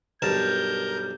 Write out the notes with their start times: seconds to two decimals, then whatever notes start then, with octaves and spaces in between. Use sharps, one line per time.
0.22 B1 G2 A#4 A5 A#5 G6